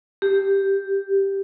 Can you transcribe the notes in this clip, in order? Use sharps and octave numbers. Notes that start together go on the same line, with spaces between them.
G4